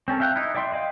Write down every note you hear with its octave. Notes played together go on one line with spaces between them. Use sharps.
C4 C#4 A4 A#4
E5 F5 G5 A5 F#6
D#4 E4
D5 E5 G5 B5 C6
D5 D#5 F5 G5